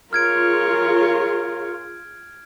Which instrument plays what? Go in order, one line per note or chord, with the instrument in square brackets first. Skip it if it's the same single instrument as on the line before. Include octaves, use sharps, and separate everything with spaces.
[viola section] F4 G#4 [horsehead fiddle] A#4 C#5 [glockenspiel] F6 G#6 D7